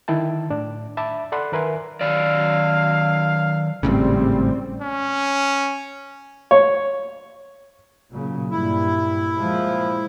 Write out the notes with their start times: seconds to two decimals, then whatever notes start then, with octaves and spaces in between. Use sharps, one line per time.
0.08 D3 D#3 E4 G5 A5
0.51 A2 D4
0.97 E5 A5 B5 D6
1.32 A4 D5 F#5 B5 C6 F#6
1.52 D#3 A#4 B4 E5 G#5 C6
2.01 D#3 F#3 D5 F5
3.83 G#1 A2 C#3 G3 C4
4.82 C#4
6.51 C#5
8.12 A#2 C#3 F#3
8.51 G2 A#2 G3 E4
9.37 A#2 F3 G#3